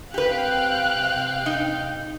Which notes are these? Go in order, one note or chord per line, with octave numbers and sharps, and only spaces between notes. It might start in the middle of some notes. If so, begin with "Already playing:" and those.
C3 G4 B4 F5 G5 F#6
D#4